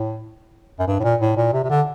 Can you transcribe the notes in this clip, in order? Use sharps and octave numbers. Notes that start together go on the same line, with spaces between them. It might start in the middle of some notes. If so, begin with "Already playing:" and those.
Already playing: A2
F#2
G2
A2
A#2
A2
A#2
C3
C3
D3